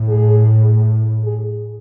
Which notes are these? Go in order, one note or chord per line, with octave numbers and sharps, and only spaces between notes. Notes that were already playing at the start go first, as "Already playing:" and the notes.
Already playing: A2
G#4
G#4